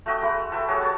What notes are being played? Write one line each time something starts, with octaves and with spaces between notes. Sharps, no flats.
A3 F#4 D#5 G5
G#3 A3 F#4 B5
A4 B4 E5 G5
F#3 G3 F#4 G#4
A4 C#5 D5 A5